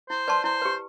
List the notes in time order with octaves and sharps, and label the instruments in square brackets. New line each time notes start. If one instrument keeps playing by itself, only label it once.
[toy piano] E4 [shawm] C5
[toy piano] B4 D5 A5 C6
[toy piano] E4 [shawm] C5
[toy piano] G4 B4